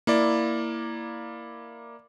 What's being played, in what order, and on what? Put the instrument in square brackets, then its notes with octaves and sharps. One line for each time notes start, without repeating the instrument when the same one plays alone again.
[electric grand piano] A#3 E4 D5